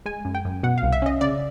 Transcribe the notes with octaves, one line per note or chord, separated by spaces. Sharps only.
G#3 G#5
F#2
G5
F#2
B2 F#5
F5
C2
E5
C#4 D#5
C#3 D5